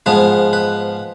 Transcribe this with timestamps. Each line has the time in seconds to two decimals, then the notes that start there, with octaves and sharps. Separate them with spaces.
0.06 G#2 F3 G#3 B3 B4
0.53 B4